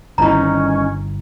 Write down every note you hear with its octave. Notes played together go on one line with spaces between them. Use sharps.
G1 G2 D#3 C#4 D#4 E4 A#5